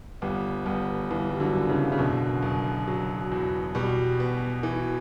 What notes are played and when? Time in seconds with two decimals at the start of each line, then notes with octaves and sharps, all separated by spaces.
0.22 G1 G3 B3
0.66 G1 G3 B3
1.10 G1 E3 G3
1.29 G3
1.40 D3 F#3
1.55 F#2
1.69 C#3 E3
1.92 C#3
1.98 F#1 B2 D3
2.42 F#1
2.88 F#3
3.32 E2
3.75 B2 G3
4.20 B3
4.63 E3